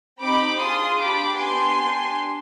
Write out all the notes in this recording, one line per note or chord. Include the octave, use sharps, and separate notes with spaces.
C4 D#4 G4 B5 D6
D4 F4 G#4 C6 D#6
D4 G4 B5 D6
B3 D4 G4 G#5 C6
D4 G4